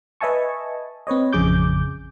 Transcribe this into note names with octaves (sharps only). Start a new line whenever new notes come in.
B4 D#5 E5 G#5 A5 C#6
C4 B4 C#5 D#5
A1 F2 C#3 G#4 D6 G6